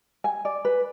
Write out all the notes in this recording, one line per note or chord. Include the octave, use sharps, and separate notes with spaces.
G#5
D5
B4